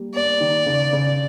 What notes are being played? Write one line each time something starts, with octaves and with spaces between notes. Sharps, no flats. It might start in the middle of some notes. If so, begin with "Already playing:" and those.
Already playing: G3 A#3
A#3 D5
D#3
C#3
C#3